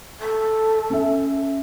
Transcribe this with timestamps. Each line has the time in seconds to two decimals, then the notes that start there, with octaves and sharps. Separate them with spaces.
0.20 A4
0.90 C#4 E5